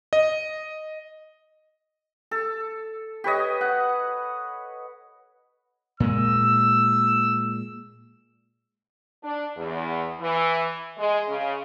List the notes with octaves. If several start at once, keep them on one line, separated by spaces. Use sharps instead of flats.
D#5
A4
G4 B4 C#5 D#5
F#5
A#2 G#3 E6
D4
E2
E3
G#3
C#3